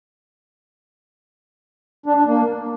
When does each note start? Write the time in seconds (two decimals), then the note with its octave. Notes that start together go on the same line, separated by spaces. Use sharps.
2.06 D4
2.16 D4
2.27 A#3